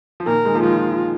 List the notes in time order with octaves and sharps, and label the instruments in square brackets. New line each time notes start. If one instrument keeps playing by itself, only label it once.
[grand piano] F3
[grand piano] A#2 D#3 [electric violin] A#4
[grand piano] D#3 G#3
F3 A#3
[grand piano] D#3 G#3 [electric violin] F4